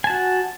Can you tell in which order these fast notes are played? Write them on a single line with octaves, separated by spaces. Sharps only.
G#5 A5 F#4